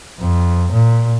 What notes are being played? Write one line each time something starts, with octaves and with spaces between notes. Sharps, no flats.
F2
A#2